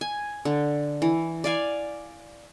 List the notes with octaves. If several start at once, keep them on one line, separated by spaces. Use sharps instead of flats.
G#5
D3
E3
D5 F5 G#5